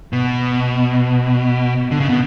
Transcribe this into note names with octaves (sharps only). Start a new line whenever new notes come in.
B2
D3
C#3
B2